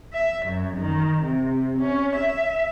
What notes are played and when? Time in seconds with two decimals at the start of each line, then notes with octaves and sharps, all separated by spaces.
0.13 E5
0.47 F#2
0.77 D#3
1.23 C3
1.79 C#4
2.17 E5